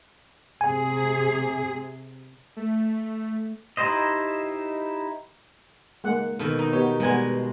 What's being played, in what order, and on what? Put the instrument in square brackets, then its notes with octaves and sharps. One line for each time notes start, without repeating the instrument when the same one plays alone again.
[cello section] C3 G#4 [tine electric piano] G#5
[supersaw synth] A3
[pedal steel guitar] D#4 E4 G4 C5 D#5
[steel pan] G#3 A#3 F#5
[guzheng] B2 D#3 [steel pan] A4
[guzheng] D#4
[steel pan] B3 C#5 [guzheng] G4
[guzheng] B2 G#3 [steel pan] G3 B3 G#5